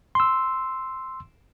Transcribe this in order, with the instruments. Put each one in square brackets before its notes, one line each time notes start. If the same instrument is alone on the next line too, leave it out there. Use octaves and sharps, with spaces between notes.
[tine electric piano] C6 E6